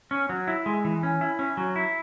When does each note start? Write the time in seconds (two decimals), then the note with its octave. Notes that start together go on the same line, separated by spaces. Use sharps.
0.11 C#4
0.29 F#3
0.48 E4
0.66 G#3
0.85 E3
1.03 C#4
1.21 E4
1.39 C#4
1.57 F#3
1.76 E4